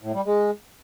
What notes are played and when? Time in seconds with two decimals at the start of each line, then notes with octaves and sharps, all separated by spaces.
0.03 A2
0.14 G3
0.26 G#3